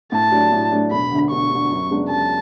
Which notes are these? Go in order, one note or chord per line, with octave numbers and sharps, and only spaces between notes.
A2 A5
F#3 A3 D4
A2
F#3 A3 D4
E1 B5
D2 D3
E1 C#6
D2 D3
F#2
C#3 G#3 B3 D4
F#2 A5